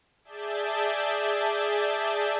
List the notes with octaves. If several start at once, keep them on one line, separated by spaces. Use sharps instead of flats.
G#4 D5 E5 A5 G6